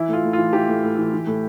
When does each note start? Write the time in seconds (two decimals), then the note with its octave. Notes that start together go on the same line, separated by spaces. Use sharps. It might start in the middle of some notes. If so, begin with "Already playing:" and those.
Already playing: E3 E4
0.08 A2 F4
0.24 A2
0.33 E3 F4
0.53 E3 G4
0.69 A2
0.83 A2
0.98 E3
1.13 E3
1.27 A2